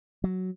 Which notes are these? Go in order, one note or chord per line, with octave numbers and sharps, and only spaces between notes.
F#3